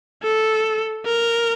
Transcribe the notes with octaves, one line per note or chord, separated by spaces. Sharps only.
A4
A#4